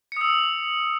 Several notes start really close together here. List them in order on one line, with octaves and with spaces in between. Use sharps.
C#7 D#6 E6